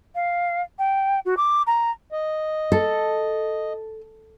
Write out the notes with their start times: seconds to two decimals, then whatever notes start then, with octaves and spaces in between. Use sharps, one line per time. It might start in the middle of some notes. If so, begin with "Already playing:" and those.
0.15 F5
0.78 G5
1.25 F#4
1.37 D6
1.66 A#5
2.12 D#5
2.72 A4